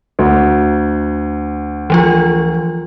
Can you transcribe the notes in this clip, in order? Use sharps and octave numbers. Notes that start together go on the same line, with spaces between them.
D2
E3 F3 F4